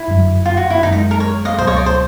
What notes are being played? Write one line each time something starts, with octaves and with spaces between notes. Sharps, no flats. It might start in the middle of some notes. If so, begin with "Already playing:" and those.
Already playing: E4
G1 F#2 D3 F#3
F4
F#4
E4
F#2 D#3 G#3 D#4
D#4
A#4
C#5
D#5 F5
C#2 B2 F#3 C5
C#5 D#5
D5
C5